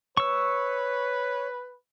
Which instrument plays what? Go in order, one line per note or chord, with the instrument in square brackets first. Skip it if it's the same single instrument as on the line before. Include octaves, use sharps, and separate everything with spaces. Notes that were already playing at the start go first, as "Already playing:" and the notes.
[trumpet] B4 [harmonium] C#5 [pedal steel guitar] C#6 E6